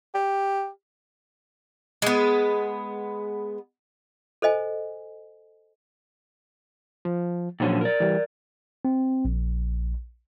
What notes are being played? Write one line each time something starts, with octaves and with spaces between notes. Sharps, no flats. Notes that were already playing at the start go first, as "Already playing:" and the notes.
G4
G#3 B3
A4 C5 D#5 G#5
F3
F2 A#2 D3 F3 F#3 C#4
A#4 D5
E3 G3
C4
A#1